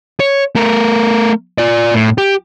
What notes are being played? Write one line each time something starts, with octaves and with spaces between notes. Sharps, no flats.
C#5
A3 A#4
F4 D5
A2
G4